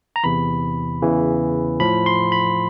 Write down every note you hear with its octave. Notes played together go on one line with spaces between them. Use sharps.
A#5
E2 C3 E3 B5
E2 C#3 E3
A2 F3 B5
C6
B5